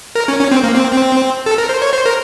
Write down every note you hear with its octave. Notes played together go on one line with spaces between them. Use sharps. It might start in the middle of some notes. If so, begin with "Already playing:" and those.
A#4
C#4
C#4
C4
A#3
C4
C4
A4
A#4
C5
C#5
C5
A#4